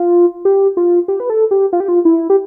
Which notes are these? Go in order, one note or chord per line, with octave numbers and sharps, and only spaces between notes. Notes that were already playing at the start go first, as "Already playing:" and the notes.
Already playing: F4
G4
F4
G4
B4
A4
G4
F4
G4
F4
E4
G4